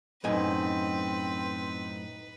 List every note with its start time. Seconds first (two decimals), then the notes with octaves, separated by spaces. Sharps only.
0.24 F#2 A2 C4 D#4 B4 D#5 G#5